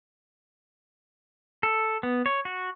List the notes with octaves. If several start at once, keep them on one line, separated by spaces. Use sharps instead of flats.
A4
B3
C#5
F#4